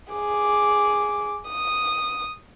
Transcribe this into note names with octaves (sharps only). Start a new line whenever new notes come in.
G#4 D6
D#6